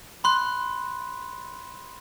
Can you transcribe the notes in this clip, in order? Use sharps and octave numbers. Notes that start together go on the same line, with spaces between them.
B5 C6 F#6